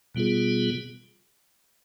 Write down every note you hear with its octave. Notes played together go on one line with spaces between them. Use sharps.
B2 G3 B3 F4 G#4